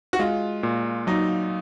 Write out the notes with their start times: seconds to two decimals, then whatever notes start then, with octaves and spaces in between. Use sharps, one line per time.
0.13 F#4
0.19 G#3 F4
0.63 A#2
1.07 F#3 D#4